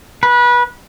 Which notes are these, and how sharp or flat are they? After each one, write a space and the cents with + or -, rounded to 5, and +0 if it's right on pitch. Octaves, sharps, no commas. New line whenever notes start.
B4 -25